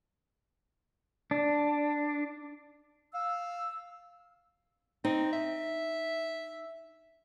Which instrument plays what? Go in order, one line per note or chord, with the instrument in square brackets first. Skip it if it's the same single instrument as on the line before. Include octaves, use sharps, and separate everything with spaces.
[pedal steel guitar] D4
[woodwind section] F5 E6
[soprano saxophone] C4 [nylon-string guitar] D#4
[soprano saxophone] E5